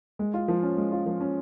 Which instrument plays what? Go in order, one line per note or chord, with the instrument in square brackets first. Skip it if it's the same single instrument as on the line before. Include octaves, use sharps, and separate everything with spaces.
[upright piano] G#3
F4
F3
C#4
G#3
F4
F3
C#4